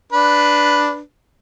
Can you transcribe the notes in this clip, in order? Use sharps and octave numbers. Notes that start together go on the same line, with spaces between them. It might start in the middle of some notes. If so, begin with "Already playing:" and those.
D4 B4